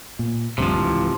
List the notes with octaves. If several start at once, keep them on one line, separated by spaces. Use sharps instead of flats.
A#2
D#1 D2 G2 C3 F3
C#2 G#2 E3